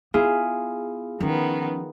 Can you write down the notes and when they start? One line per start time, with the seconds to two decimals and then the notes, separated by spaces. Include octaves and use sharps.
0.14 B3 E4 F4 G#4
1.20 D#3 F3 B3 C#4